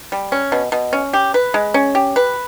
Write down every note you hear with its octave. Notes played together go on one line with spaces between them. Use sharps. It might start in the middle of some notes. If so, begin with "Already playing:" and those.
G3
C#4
B2
B2
C#4
G4
B4
G#3
C#4
G4
B4